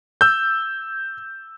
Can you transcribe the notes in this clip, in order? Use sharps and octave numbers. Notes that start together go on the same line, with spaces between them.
E6 G6